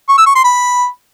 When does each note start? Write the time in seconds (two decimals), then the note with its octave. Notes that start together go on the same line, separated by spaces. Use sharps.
0.09 C#6
0.18 E6
0.26 C#6
0.35 C6
0.44 B5